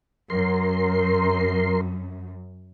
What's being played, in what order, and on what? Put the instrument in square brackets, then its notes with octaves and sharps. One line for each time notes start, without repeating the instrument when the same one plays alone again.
[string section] F#2 [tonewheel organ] A#4 C6